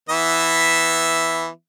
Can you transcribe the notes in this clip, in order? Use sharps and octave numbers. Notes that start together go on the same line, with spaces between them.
E3 B3 E5